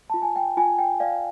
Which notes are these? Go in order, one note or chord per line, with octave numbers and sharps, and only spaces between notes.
F4 A5
G#5
G5
F4 G#5
G5
D5 F5